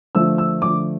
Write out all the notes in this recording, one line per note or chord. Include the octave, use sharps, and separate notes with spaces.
D3 F3 A3 E6
E6
D3 F3 A3 D6